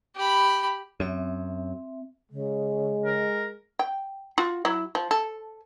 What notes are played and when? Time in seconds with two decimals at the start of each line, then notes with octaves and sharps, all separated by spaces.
0.15 G4 B5
1.00 F#2 C4 E5
2.32 C#3 G#3
3.05 A#4
3.79 G5
4.38 F4 F#4
4.65 F#3 E4
4.95 F3
5.11 A4